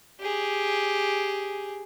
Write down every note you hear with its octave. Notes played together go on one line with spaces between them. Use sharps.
G4 G#4